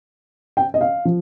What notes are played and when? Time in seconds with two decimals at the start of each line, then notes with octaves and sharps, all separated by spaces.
0.57 G5
0.74 D#5
0.81 F5
1.05 F3